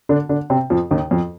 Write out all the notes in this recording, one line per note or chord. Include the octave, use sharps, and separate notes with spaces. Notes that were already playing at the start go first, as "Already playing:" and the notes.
D3 D4
D3 D4
C3 C4
F2 F3
D#2 D#3
F2 F3